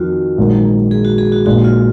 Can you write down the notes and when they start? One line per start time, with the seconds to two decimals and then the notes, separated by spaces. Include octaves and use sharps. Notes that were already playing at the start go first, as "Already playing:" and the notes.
Already playing: F2 D#3 F4 F#4
0.38 A#1 G#2 D#3 F#3
0.91 G#4
1.05 F#4
1.18 G#4
1.32 F#4
1.46 A#1 A#2 G#3 D#4 F#4
1.64 F4